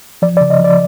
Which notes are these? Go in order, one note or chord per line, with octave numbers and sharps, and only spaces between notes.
F3 D5
D5
C#3
D#5
F3 D5